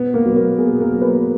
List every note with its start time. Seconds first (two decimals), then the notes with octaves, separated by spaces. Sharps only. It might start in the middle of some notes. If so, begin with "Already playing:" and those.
Already playing: B2 B3 B4
0.14 A#3 A#4
0.26 F#3
0.36 A#3 A#4
0.58 B2 G#4
0.80 A#3 A#4
0.91 F#3
1.02 B3 B4